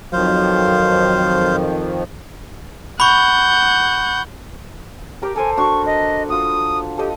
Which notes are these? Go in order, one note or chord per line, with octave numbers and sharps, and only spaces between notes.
F2 D#3 F3 F#3 C5 F5
F#5 B5 C#6 G6
G4 A#4 D6
A4 A#4 C5 G#5
D4 F#4 C#6
D#5
F4 F#4 D#6
G4 A4 D#5